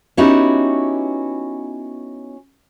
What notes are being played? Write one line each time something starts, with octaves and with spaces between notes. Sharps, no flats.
B3 C#4 D#4 E4 F#4 G4